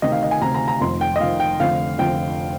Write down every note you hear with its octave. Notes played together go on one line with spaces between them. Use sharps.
D2 C3 D#3 D#5
F5
D#5
G#5
D2 C3 D#3 A#5
A#5
A#5
F1 F2 D#3 C6
G5
D#5
F1 F2 D#3 F5
G5
F1 F2 D3 F5
F1 F2 D3 G5